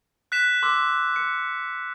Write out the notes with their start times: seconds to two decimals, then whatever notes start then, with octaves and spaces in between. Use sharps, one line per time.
0.32 F#6 B6 E7
0.63 C6 D6 E6
1.16 C#7